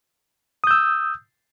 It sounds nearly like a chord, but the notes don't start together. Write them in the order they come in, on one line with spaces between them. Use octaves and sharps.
D#6 G6 E6